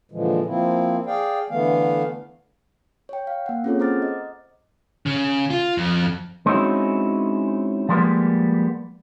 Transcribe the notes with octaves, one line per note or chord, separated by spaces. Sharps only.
A#2 D3 E3 F3 G#3
F3 A#3 C4 E4
G#4 D5 F5 G5
D3 E3 A3 B3 F5
C#5 G5
F5
A#3 F#5
C4 C#4 F4 G#4 A4 C#5
C5 F#5 A#5 D6 F6 A6
D#5
C#3
F4
F2
G#3 C4 C#4 D#4 E4 F#4
F3 G3 G#3 A#3 B3